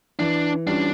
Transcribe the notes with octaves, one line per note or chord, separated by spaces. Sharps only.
E3 D4
G3 C#4 D4 F4